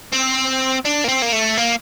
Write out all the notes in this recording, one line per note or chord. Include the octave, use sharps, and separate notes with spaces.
C4
D4
A#3
C4
A#3
A3
A#3